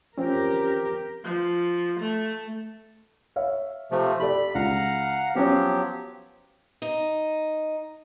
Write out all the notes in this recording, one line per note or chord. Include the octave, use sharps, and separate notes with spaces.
F3 C4 C#4 G4 A#4
F3
A3
C#5 E5 F5
C3 F3 A3
G4 A4 D5 B5
C#2 F5 F#5 A#5
F3 F#3 B3 C#4 G4
D#4